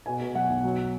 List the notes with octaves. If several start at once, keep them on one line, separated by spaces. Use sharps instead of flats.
B2 G#5
B2
F#3 F#5
B1
F#3